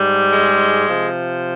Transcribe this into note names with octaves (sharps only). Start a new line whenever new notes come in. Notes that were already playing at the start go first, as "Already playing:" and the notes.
Already playing: G#2 G3
G#3
C3 F3